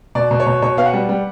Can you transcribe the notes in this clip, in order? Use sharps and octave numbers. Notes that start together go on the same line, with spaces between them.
B2 D5
B2
C#5
B2
B2 C#5
B3 F5
F#5
G3
G3